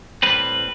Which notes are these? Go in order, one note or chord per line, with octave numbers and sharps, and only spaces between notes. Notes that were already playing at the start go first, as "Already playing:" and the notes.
A2 G3 C4 B4